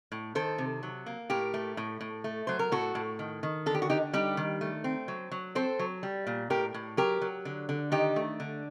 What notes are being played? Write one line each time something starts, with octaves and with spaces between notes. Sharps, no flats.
A2
D#3 A4 C5
C3
F#3
A#3
A2 G4 A#4
A3
A2
A2
A3
F#3 C5
A#4
A2 F#4 A4
A2
D#3
D#3
D3 A4
G4
F#4
D3 D#4 G4
G3 D#4 G4
D#3
A3
C4
F#3
F#3
C4 A4 C5
F#3
G3
A#2
A2 G4 A#4
A2
F#3 G4 A#4
F#3
D3
D3
D#3 D#4 G4
A3
D3